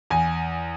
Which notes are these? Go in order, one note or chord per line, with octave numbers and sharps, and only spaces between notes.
E2 G#5